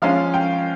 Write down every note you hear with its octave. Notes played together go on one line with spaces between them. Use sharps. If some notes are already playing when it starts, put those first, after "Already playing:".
F3 G#3 C#4 F4 F5
G5